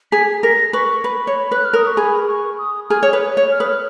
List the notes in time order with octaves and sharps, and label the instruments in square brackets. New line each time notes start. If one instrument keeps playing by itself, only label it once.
[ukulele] G#4 [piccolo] B6
[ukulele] A#4 [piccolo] A#6
[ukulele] B4 [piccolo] C#6
[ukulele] B4 [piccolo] B5
[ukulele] C#5
[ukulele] B4 [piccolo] F#6
[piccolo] F6
[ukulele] A#4 [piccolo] D#6
[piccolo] C#6
[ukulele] G#4 [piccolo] B5
[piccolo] C#6
D#6
[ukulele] G#4 [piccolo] F6
[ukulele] C#5
B4
C#5
[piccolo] F6
[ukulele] B4 [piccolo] D#6
[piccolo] F6